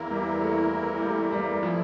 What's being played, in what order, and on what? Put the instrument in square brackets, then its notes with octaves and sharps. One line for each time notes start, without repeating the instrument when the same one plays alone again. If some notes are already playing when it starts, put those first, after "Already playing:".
Already playing: [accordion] E2 E3 A#3 E4 A#4
[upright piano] G3
A3
G3
A3
G3
G3
[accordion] E3 A3 E4 [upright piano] F3